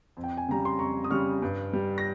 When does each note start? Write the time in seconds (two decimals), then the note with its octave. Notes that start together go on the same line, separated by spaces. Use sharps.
0.17 F2
0.24 G5
0.37 G#5
0.48 C#3 G3 A#5
0.65 C6
0.79 F2 A#5 C#6
1.04 D#6
1.11 C#3 G3 C#6 F6
1.42 G2
1.73 G3
1.98 A#6